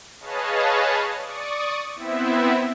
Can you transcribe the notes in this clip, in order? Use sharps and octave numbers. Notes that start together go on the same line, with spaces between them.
G#4 B4 C#5 D#5 F5 A5
D5 C#6 D#6
B3 C4 E4 E5